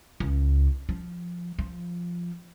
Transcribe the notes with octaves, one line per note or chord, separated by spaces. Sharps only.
C#2
F3
F3